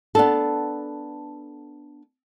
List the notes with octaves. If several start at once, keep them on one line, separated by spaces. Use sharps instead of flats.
B3 D4 A4